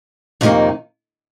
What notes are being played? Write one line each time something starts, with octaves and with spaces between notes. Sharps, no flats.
F2 C3 D#3 A#3 D#4